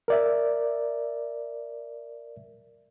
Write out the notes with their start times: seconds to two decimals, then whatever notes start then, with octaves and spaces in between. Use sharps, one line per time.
0.08 A#4 D5 E5